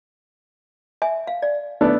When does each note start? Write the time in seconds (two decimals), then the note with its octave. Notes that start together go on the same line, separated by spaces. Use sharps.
1.02 E5 G#5
1.27 F5
1.42 D5
1.81 A3 B3 D4